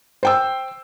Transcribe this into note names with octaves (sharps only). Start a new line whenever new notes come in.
C5 G5 E6